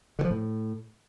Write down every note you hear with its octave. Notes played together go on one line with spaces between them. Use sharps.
D3
F3
A2